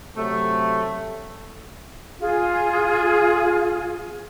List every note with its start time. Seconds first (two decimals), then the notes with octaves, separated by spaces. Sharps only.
0.16 C3 F#3 A3
2.21 F4 G#4